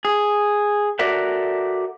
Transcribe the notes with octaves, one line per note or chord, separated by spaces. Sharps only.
G#4
F#4 A4 A#4 D5 E5 F#5